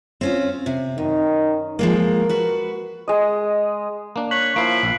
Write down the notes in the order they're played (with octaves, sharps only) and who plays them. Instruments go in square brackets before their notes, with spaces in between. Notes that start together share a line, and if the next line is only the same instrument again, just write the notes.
[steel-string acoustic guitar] C4 C#4 F4
C3
[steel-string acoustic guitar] F#2 [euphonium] D#3
[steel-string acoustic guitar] F3 G#3 A#3 [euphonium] A#4
[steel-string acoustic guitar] F#4 B4
[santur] G#3 D#5
[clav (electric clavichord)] A#3 D4
[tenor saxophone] C#5 [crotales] F#6 B6 F#7
[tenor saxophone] F3 [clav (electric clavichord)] A#3 E4 [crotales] C7 D7
[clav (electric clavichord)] A#1